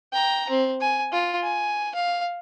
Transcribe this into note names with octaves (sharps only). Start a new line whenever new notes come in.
G5 A#5
C4
G#5
F4
G#5
F5